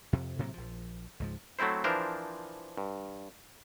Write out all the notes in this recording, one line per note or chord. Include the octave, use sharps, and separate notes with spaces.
F2 C3
A2 C3 F#3 A#3
A#1 F3
C#2 G#2 F3
F#3 A3 C4 E4 C5
E3 F3 D4 A#4 C5
G2